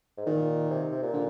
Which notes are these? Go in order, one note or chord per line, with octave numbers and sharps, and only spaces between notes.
G#2
A#2 D#3
C3
C3
A#2
D3